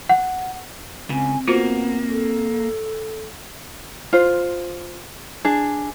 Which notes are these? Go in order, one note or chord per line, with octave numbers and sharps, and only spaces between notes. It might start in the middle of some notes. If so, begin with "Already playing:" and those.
F#5
C#2 C#3 C4 G#5
A#3 B3 F4 F#4 C5
A4
F4 C5
D4 G#4